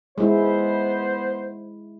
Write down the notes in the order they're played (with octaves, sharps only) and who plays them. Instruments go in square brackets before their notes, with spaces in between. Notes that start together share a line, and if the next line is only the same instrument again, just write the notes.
[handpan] G#3 E4 [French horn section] B3 C5